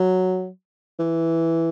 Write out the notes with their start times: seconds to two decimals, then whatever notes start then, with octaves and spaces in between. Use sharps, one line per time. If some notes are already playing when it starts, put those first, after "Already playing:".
Already playing: F#3
0.99 E3